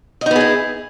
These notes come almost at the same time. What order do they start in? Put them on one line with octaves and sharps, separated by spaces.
D#5 D#4 B3 G#4 E4